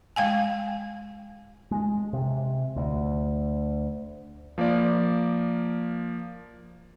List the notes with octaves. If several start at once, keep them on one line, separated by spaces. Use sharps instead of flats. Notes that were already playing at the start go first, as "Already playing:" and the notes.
G#3 F5 G5 G#5
G#3
C3
D2
F3 A#3 A#4 D5